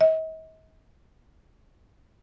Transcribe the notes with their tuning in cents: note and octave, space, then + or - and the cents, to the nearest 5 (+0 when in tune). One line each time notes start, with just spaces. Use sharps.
D#5 +45